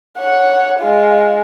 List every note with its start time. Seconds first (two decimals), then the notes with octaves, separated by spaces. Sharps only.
0.18 C#5 F#5
0.80 G#3 F4